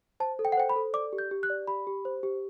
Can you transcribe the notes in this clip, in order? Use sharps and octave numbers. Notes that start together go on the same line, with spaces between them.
C5 A5
A4
G5
F#5
C5 G5
B5
A4
D5 D6
G4
G6
G4
F#6
D5
G4 B5
G4
C5
G4